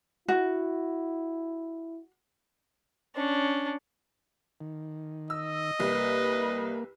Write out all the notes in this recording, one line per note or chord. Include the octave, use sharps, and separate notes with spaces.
E4 F#4
C#4 D4
D#3
D#5 E6
C2 A#3 B4